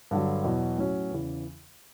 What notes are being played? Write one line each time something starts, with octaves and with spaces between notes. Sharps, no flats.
G2 D3 F#3
E2 B2 F#3
A2 F#3 C#4 F#4
E2 C#3 E3